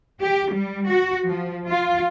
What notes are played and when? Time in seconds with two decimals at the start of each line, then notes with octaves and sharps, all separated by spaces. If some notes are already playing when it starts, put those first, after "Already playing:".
0.21 G4
0.53 G3
0.88 F#4
1.28 F3
1.68 F4